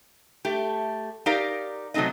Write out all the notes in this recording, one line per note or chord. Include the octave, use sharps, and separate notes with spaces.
A3 G4
D#4 G4 A#4 D5 F5 A#5
C3 F#3 A3 C4 D#4 D#5